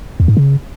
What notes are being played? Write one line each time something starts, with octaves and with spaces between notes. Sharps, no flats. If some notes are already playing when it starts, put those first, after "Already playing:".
E2
G#2
C#3